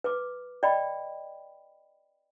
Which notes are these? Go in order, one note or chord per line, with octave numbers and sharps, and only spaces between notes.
B4 D6
D5 D#5 G5 B5